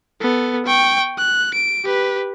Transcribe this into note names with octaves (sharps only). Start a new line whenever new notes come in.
B3 A4
G5 C#6
F#6
D7
G4 B4